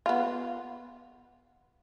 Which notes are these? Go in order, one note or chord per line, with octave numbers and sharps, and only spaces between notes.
B3 F4